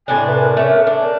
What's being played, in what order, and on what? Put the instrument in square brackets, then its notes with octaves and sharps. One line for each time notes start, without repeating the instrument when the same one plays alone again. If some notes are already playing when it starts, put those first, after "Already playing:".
[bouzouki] A2 C3 D4 [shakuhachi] G#5
[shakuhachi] B4
A#4
[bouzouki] A3 C#4
D4
[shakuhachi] A#4